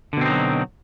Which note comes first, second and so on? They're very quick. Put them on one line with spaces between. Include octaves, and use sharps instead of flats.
D3 B2 C4 D#4 F#3